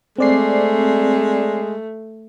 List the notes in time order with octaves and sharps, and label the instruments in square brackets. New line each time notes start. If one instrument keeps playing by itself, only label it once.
[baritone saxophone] G#3 [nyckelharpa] A3 [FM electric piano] C4 D5 C7